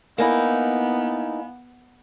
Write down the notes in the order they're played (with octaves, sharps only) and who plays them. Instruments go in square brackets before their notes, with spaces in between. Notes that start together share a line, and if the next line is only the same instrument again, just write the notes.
[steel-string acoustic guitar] A#3 D#4 E4 [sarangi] B3 [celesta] F5 G#5 B5